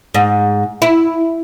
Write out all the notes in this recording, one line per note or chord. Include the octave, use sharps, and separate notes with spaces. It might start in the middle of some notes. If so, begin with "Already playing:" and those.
G#2
E4